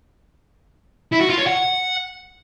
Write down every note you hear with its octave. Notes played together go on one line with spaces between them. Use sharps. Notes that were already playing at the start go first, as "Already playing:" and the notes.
E4
F#4
F4
C#5
F#5